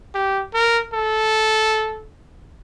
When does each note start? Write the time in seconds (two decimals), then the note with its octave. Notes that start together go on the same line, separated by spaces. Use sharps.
0.14 G4
0.54 A#4
0.93 A4